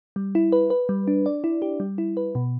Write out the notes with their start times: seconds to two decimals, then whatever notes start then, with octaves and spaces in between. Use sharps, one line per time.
0.16 G3
0.35 E4
0.52 B4
0.70 B4
0.89 G3
1.08 D4
1.26 D5
1.44 E4
1.62 G4
1.80 G3
1.98 E4
2.17 B4
2.35 B2